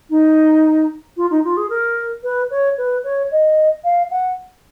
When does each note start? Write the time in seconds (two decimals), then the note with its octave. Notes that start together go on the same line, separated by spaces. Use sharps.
0.10 D#4
1.17 F4
1.31 D#4
1.44 F4
1.57 G#4
1.70 A#4
2.23 B4
2.51 C#5
2.78 B4
3.04 C#5
3.31 D#5
3.84 F5
4.11 F#5